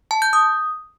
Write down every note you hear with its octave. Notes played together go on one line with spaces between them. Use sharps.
A5
G6
D#6